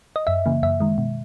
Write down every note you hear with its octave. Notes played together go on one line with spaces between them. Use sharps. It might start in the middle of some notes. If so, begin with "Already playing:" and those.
D#5
F#2 E5
C#3 E3 A#3
F#2 E5
D#3 G#3
B2